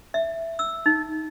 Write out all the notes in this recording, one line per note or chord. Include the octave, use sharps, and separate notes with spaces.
E5
E6
D#4